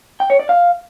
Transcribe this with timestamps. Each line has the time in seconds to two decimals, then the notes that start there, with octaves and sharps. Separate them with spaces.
0.20 G5
0.30 C#5
0.39 D5
0.49 F5